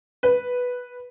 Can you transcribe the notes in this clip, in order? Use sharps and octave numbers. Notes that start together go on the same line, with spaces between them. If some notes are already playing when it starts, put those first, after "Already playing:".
B4